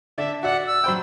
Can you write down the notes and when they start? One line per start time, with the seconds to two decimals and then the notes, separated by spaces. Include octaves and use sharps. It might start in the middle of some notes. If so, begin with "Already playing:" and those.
0.18 D3 D5 E5
0.43 F#4 D5 E5 F#5 F#6
0.67 D5 E6
0.84 F#3 C5 G5 B5